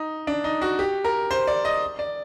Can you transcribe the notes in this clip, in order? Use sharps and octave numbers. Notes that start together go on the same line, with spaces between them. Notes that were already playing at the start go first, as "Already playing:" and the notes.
Already playing: D#4
D4
D#4
F#4
G4
A#4
C5
D5
D#5
D5